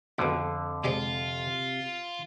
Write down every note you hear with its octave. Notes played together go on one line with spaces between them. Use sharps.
A#1 F2 B2 D3
C3 G3 G#3 C4 F4